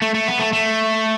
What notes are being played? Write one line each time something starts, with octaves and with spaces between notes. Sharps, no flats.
A3
A3
B3
A3
A3